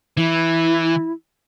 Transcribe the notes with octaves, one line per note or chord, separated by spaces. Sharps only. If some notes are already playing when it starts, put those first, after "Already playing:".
E3 E4